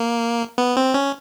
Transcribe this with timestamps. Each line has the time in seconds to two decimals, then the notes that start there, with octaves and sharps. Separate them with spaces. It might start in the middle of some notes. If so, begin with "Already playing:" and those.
Already playing: A#3
0.58 B3
0.77 C4
0.94 C#4